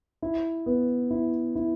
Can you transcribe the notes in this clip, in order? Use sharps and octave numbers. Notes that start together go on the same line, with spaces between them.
E4
B3
E4
E4